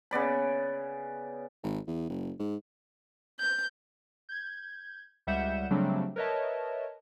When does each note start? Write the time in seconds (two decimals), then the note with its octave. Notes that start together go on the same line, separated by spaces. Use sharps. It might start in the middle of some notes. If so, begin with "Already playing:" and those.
0.11 C#3 B3 D5 B5
1.64 G#1
1.87 E2
2.09 F#1
2.39 G#2
3.40 G6
4.29 G6 G#6
5.27 C#2 G3 E5 F#5 G6 E7
5.70 C#3 F#3 G3 A3 C4 D4
6.16 A#4 B4 C#5 D#5 E5 A5